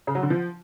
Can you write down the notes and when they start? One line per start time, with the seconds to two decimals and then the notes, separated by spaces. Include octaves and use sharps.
0.07 C#3
0.15 F#3
0.23 D3
0.30 F3